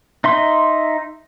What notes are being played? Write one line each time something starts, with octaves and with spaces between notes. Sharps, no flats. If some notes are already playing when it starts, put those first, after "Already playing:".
D#4 E5 C6